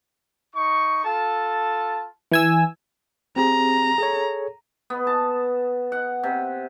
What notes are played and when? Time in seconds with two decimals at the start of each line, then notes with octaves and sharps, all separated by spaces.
0.55 D#4 C#6
1.04 F4 A4 A5
2.32 E3 G#5 E6
3.36 C4 G4 G#4 A#5
3.98 G#4 A4 C#5
4.90 B3
5.07 A5
5.92 F#5
6.23 C3